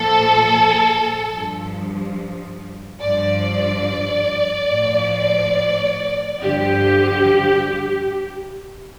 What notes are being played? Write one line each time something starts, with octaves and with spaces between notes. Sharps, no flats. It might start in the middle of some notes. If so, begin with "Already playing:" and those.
Already playing: A#2 F3 A4
G2 F3
G2 F3 D5
A2 F3
G2 D3 F3 G4